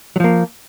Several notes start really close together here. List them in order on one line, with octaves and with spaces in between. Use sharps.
F#3 F3 A#3